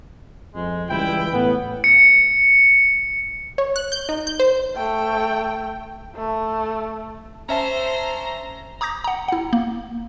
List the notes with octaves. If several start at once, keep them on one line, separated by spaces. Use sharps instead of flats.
F2 G#3
C#2 E3 G3 E4 G5
A2 B3 B4
C#7
C#5
F#6
G6
D#4
G6
C5
A3 G5
A3
C#4 C5 E5 A5 A#5
A#5 D6 D#6 G6 A#6
F#5 A#5
E4 F#5
A#3